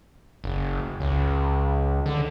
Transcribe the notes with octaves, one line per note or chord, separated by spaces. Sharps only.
F#1
C#2
D3